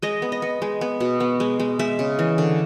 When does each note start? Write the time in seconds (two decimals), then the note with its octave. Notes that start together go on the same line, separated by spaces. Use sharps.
0.02 G#3 D#5
0.22 B3
0.32 D#5
0.42 B3
0.62 G#3
0.81 B3
1.00 B2
1.20 B3
1.40 G#3
1.60 G#3
1.79 G#3 E5
1.99 C#3
2.19 E3
2.38 D3